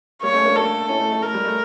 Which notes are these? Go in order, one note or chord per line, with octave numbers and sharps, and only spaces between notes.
G3 A#3 C#5
A3 C#4
A#3 D4
A#3 D4 A4
C#4 E4
A3
A3
A3 A#4
G3
A3